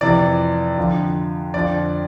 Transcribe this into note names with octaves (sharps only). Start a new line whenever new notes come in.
F2 C3 E3 D5
F2 D3 F3
F2 D3 F3 D5